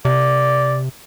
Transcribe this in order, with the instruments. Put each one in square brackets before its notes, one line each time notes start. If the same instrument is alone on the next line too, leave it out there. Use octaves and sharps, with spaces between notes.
[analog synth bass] C3 [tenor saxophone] D5